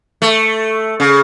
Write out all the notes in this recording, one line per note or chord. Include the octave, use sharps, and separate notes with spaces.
A3
C#3